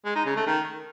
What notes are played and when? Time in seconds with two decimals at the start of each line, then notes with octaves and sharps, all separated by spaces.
0.05 G#3
0.16 D#4
0.26 C#3
0.36 A3
0.47 D#3